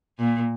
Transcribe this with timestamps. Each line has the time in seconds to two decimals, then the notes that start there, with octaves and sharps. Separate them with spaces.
0.19 A#2